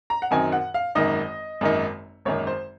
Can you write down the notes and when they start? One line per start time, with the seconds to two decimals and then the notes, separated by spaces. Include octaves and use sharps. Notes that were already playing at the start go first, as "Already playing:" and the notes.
0.10 A#5
0.22 F#5
0.31 F#2 D#3 F#3 C4 D#4 G#5
0.52 F#5
0.74 F5
0.95 G#1 F#2 D#3 A#3 D#4 D#5
1.61 G#1 F#2 D#3 A#3 D#4
2.25 G#1 F#2 D#3 A#3 C#5
2.47 C5